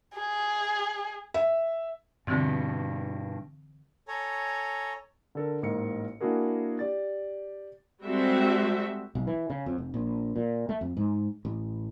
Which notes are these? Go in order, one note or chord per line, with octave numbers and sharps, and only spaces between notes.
G#4
E5
G2 B2 D3 E3 C4
A4 C#5 G#5 A#5
D3 A4 A#4
A1 G#2 A#3 A#4 C#7
A#3 D4 E4 F#4 G#4 A#4
G4 D5 A6
G3 G#3 C4 F#4 A4 E5
B1
E3
C#3
F2
F1
A#1
A#2
A3
F2
G#2
A1